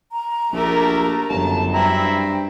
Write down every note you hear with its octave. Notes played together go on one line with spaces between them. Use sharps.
A#5
A#1 A3 G4 A#4
G1 F#2 A5
G2 C4 E4 G5 A#5